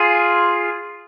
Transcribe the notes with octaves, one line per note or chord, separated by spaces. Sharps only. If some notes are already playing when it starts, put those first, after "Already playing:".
Already playing: F4 G#4